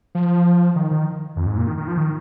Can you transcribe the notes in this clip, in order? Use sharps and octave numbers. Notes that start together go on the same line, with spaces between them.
F3
D#3
D#3
F2
G#2
A#2
D#3
D#3
F3
D#3